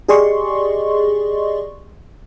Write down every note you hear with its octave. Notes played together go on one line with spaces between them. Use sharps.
G4 G#4 D5 D#5 C6 C#6